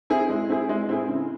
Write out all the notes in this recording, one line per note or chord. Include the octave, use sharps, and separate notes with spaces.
C4 E4 G#4
G#3
C4 E4 G#4
G#3
C4 E4 G#4
C#3